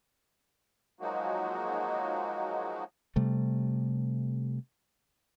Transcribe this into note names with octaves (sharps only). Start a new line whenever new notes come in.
F3 F#3 G#3 A#3 D#4 F#4
C3 G3 A3